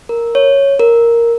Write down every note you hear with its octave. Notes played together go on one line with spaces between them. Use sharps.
A#4
C#5
A#4